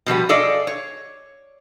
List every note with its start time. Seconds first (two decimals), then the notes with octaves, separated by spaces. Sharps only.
0.06 B2 F3 G3 B3
0.29 G#4 A4 D5 D#5 F5
0.67 C#5